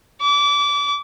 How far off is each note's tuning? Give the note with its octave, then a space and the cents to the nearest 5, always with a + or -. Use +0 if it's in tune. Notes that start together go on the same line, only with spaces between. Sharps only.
D6 -30